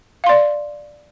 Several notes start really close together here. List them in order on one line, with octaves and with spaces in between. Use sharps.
F5 C6 D5